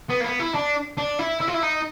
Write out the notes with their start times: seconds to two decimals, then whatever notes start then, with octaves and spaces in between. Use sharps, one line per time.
0.10 B3
0.21 A#3
0.24 B3
0.39 E4
0.54 D4
0.97 D4
1.19 E4
1.41 E4
1.48 F4
1.55 E4
1.63 D#4